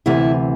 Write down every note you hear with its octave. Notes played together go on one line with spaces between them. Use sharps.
D2 C3 E3 E4